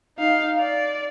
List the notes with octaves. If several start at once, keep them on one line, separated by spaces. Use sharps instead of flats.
D#4 F5
D5